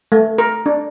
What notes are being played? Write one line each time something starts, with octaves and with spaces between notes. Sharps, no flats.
A3
A#4
D4